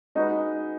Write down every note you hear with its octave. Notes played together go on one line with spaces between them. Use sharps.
G#3 D#4 F#4 B4